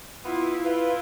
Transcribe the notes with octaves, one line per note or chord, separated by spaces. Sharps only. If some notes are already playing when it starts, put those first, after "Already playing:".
B3 E4 F4
E4 F4 B4